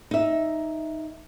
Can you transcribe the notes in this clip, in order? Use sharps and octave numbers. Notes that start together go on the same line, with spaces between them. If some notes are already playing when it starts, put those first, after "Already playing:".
D#4 E5